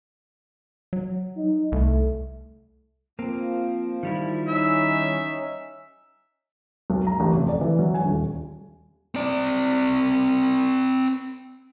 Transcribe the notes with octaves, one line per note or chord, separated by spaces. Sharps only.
F#3
D#4
C2 A3
F3 A#3 C4
D#3 G3 E4
C#4 D#4 E5
B1
A#5
A1
F1
D5
E3
F#3
G#5
D#1
C4 D5